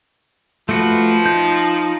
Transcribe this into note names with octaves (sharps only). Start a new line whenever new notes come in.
F3 A3 F#4 B4
D#4 G6